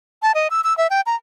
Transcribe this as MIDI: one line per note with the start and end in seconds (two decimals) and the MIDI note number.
0.22 0.32 81
0.35 0.48 75
0.51 0.61 88
0.64 0.76 88
0.78 0.87 76
0.90 1.01 79
1.06 1.15 82